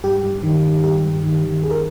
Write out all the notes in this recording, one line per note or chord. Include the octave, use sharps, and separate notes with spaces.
G2 G4
G2
D#3
D#3
G2 G4
G2
D#3
D#3
D#2 G#4
A#4